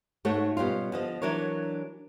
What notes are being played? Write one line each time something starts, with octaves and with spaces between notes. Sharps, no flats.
G#2 A3 F#4 A4 C#5 E5
B2 G3 C#4 F4
D3 F3 D#5
E3 F#3 D4 A#4 C#5